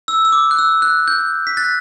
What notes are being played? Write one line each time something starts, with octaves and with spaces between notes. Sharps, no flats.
E6
E6
D6
F#6
E6
F#6
G6
B6
F#6 A6